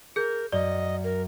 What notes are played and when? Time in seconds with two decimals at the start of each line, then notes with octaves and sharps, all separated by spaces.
0.16 G#4 A#4 G6
0.52 F#2 D5 D#5
1.04 A#4